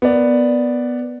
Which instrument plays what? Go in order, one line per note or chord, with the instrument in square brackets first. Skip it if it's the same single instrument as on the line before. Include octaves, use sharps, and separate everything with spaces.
[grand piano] B3 A#4 D5